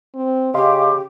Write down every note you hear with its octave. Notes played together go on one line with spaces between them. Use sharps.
C4
C#3 G4 D#5 F5 C6